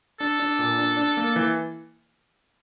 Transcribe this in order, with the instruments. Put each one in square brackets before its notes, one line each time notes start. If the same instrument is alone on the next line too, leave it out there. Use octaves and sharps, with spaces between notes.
[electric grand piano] D4 [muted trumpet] A4
[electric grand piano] D4
A#2
D4
D4
A#3
E3